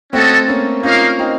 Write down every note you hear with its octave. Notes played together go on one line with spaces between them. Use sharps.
A3 C4 C#4 F#4 A4 D#5
A#3 C#4
A#3 C#4 D#4 F4 A#4 F5
C4 D#4